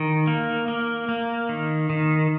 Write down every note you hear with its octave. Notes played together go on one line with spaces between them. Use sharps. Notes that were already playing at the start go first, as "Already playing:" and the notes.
Already playing: D#3
A#3
A#3
A#3
D#3
D#3